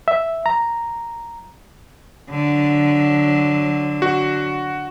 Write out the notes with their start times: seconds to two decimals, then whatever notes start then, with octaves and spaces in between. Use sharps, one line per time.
0.08 E5
0.46 A#5
2.30 D3 F#3
4.02 F#4